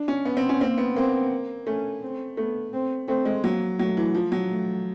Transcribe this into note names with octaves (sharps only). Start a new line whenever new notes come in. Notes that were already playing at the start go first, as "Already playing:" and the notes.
Already playing: D4
C#4
B3
C4
C#4
A#3 C4
B3
A#3 C4
A3 C#4
C4
A3 B3
C4
A3 C4
G#3
F#3 A#3
F#3 A3
E3
F3
F#3
A3